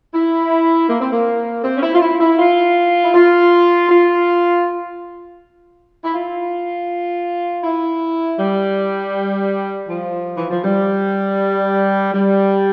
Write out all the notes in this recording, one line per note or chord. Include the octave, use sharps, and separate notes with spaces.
E4
A#3
C4
A#3
C4
C#4
E4
F4
E4
E4
F4
E4
F4
F4
E4
F4
E4
G3
F3
E3
F3
G3
G3